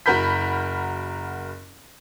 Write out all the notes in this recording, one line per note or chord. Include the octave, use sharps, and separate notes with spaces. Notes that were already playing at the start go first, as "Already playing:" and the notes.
F#1 F#4 A#4 B5 G6 B6